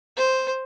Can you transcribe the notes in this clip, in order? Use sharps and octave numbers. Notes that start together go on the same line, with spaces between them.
C5